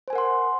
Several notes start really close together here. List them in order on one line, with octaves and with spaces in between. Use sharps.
C5 G#5 A#4 F#5 C6